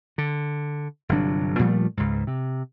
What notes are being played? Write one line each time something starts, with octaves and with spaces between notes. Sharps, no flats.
D3
G1 C3 F#3 D4
A#2 F3 G3 A3
C#2 G#2
C3